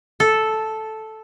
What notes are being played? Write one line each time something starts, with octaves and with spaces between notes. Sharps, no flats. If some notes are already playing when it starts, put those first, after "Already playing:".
A4